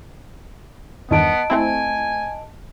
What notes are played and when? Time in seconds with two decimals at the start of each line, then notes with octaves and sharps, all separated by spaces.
1.11 E2 G2 D#3 B3 D#5 A5 D7
1.50 A3 C4 E4 G#5